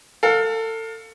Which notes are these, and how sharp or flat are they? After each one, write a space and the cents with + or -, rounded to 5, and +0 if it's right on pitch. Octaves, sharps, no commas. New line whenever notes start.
A4 +30 F5 +25